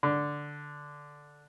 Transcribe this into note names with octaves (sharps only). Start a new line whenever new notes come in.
D3